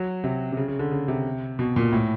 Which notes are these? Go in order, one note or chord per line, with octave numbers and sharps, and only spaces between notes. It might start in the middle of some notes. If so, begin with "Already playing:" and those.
Already playing: F#3
C3
C3
C#3
C#3
D3
C#3
C3
B2
A#2
A2